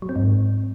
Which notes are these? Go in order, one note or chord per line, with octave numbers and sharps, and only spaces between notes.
F#3
C4
G#2